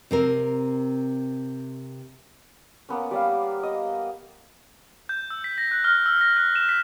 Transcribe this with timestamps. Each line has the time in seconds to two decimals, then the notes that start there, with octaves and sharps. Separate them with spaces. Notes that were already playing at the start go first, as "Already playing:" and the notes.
0.11 C3 C4 A#4
2.89 A#3 B3 C#4
3.11 G3 D5 F5
3.63 D#5
5.09 G6
5.30 E6
5.44 B6
5.58 A#6
5.71 F#6
5.84 F6
6.06 E6
6.21 A#6
6.36 F#6
6.56 E7
6.69 B6